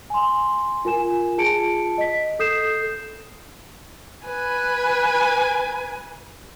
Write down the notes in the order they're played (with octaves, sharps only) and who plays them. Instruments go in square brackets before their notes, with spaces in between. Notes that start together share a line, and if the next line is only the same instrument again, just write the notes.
[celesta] G#5 C6
F4 A#4 G#5 E7
F4 G#4 A5 C#7 D7
D#5 B6
A4 D#6 G6 C7 E7
[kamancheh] B4 G#5